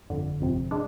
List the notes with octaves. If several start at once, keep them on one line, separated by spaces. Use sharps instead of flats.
G1 F2 D3
G1 F2 C3
G#3 D4